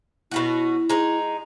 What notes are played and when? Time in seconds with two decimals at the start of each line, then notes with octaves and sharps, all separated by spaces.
0.32 B2 C#4 E4 F#4
0.89 G#3 D#4